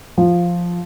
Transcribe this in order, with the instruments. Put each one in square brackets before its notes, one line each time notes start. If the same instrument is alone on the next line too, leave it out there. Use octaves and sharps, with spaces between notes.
[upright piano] F3